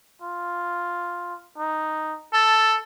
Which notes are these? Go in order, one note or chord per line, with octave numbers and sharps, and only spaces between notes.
F4
D#4
A4 A5